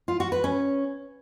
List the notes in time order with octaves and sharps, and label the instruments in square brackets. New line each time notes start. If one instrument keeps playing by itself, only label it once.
[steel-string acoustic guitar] F4
F#4
B4
C#4